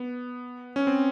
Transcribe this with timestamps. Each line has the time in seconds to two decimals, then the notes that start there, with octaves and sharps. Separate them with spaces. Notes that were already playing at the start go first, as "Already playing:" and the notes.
Already playing: B3
0.76 C#4
0.87 C4